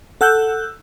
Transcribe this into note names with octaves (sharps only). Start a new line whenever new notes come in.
A4 F#5 E6 F#6 G6